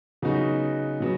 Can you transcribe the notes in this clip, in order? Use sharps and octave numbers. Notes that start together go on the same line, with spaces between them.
C#3 F#3 B3 D#4 F#4
C#3 F#3 B3